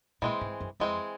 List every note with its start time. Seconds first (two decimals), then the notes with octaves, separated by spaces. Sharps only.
0.22 A#2 E3 G#3 C4
0.41 G#2
0.60 F#2
0.80 F2 E3 G#3 C4